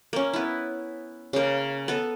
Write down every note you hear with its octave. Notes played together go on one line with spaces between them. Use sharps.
A#3 C#4
B3 E4
C#3 A#3
B3 A4